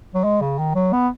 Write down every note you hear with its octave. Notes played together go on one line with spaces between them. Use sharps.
F#3
G#3
C#3
D#3
F#3
B3